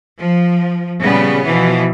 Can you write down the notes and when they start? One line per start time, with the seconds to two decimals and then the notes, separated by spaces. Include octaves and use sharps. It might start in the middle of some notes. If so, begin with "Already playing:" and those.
0.19 F3
1.00 A#2 C#3 G3 B3
1.45 B2 E3 F3